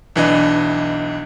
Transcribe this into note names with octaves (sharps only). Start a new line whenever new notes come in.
B1 E3 D4 D#5